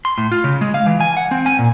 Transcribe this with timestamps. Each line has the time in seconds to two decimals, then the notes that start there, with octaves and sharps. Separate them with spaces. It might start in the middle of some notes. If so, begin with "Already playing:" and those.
0.05 C6
0.18 A2
0.32 F4
0.44 C#3
0.61 G#3
0.74 F5
0.86 E3
1.00 G#5
1.17 F#5
1.31 C4
1.46 G#5
1.59 A#2